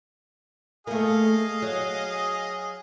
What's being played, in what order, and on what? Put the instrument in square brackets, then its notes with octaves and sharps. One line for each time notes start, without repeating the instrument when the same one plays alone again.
[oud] A3 A#3 [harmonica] G#4 D#5 F5
[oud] F#3